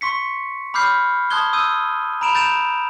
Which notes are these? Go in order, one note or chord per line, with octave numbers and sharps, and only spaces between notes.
C6 C#6 B6 C#7
B5 D6 F6 G6 C7
A5 C6 D#6 F#6 G#6 G7
D#6 E6 G6 D#7
A#5 B5 D7 E7 F7
G6 A6 D7 E7 F7